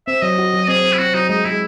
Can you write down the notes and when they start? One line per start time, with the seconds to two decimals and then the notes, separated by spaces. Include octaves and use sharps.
0.07 C4 E5
0.22 F#3 D#5
0.38 F#4
0.54 F#3
0.68 C4 G#4
0.84 C4
0.93 E4
0.99 C4 F#4
1.14 F#3 D#4
1.29 G#3 D#4
1.44 G#3 E4